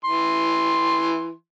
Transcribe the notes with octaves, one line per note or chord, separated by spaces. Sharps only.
E3 C6